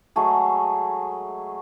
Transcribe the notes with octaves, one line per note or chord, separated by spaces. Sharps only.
F#3 G#3 A3 G#4